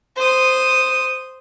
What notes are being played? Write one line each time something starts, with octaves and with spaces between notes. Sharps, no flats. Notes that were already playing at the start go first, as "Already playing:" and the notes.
C5 D#6